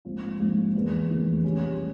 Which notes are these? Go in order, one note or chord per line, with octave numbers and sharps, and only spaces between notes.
A#1 G#2 F3 C4 F4
A#1 G#2 F3 C4 F4
F1 E2 E3 A#3
F1 E2 E3 A#3
C2 A#2 G3 C#4